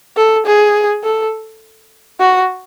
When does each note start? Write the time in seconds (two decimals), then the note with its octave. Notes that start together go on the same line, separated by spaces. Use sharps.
0.16 A4
0.46 G#4
1.04 A4
2.20 F#4